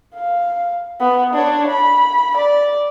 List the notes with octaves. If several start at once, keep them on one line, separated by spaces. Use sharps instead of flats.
F5
B3
D4 C#5
B5
D5